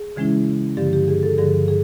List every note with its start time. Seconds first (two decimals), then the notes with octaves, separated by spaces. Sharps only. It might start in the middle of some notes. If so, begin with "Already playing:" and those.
Already playing: G#4
0.16 C#3 E3 G#3 C#4 E4
0.77 G2 D3 F3 G4
0.93 G4
1.08 G#4
1.23 A4
1.38 G2 D3 F3 G#4
1.68 G#4